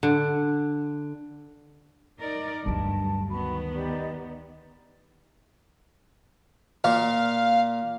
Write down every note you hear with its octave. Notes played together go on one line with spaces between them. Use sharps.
D3
D#4 A#4 D5
D2 G2 F#3 A5
D#3 B3 F#4 B5
D#4 G4 D5
A#2 F5